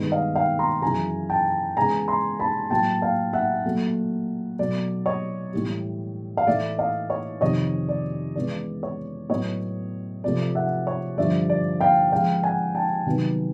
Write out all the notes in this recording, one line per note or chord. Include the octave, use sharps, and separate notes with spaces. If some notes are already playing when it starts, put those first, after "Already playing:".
Already playing: G2 D#3 G#3 B3
D#5 F5
F5 G5
A#5 C6
F#2 C#3 E3 G#5 A#5
G5 A5
C#3 E3 G#3 B3 G#5 A#5
A#5 C6
A5 B5
A2 F#3 A#3 G5 A5
F5 G5
E5 F#5
A#2 F#3 A3
B2 F#3 A3 D5
C#5 D#5
A2 E3 G3
F5
A2 E3 A3 D5 E5
D#5 F5
C#5 D#5
F2 C3 D#3 C#5 D#5
D5
C#3 E3 G#3 B3 D5
C#5
A2 F#3 B3 C#5 D#5
C3 F3 A3 D5
E5 F#5
C#5
G2 D3 F3 D5 E5
D5
F5 G5
C#3 F3 G#3 F5 G5
F#5 G#5
G5 A5
C3 D#3 F#3 B3